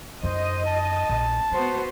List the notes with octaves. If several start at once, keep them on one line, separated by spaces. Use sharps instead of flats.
F#2 D#4 C5 D#5
A5
A#1
G#3 B3 F#4 C5